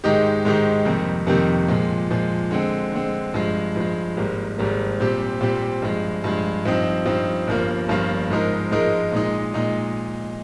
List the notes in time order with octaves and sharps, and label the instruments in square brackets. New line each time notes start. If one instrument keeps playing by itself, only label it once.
[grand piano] G#2 D#3 G#3 D#4 G4
G#2 D#3 G#3 D#4 G4
F2 C3 D#3 G3 A#3
F2 C3 D#3 G3 A#3
A#2 F3 G#3
A#2 F3 G#3
D3 G#3 C4
D3 G#3 C4
G2 F3 G#3
G2 F3 G#3
G#1 G#2 G3 A#3
G#1 G#2 G3 A#3
A#2 G3 C4 G4
A#2 G3 C4 G4
G2 F3 G#3
G2 F3 G#3
G2 F3 C4 D#4
G2 F3 C4 D#4
G1 G2 F3 A#3 F4
G1 G2 F3 A#3 F4
G#2 F3 G#3 D#4 A#4
G#2 F3 G#3 D#4 A#4
A#2 G#3 D#4
A#2 G#3 D#4